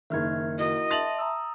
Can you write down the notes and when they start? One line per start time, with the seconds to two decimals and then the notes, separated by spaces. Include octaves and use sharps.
0.10 F#1 D#3 E5 F6 G#6
0.59 E4 F#4 A#4 D#5
0.91 E5 A5 C6 A6 F7 F#7
1.19 A#5 D#6 E6